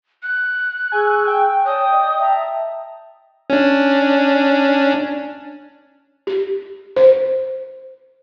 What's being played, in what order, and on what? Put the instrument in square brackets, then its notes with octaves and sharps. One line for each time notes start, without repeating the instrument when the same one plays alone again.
[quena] F#6
[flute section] G#4 C#6 E6 [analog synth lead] G#5
[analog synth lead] G5
[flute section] C#5 D5 A5 [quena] D#6
[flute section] D5 D#5
E5 A5 A#5
[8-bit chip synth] C#4 D4
[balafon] G4
C5